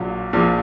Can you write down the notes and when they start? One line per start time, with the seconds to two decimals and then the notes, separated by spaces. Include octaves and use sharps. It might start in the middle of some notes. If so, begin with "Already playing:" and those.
Already playing: A#1 A#2 F#3
0.33 A#1 A#2 F3